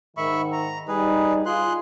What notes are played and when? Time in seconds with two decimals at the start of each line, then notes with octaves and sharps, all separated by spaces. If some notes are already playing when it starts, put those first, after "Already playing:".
0.17 G#2 D#3 E5 B5 C#6
0.52 A#5
0.88 G3 D#4 G#4 B4
1.46 F4 G#4 C6 F#6